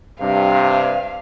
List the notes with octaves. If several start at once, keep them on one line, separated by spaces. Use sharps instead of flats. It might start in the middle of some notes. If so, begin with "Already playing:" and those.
G2 C3 F5